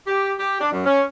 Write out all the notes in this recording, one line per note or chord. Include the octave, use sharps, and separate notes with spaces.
G4
G4
D4
F#2
C#4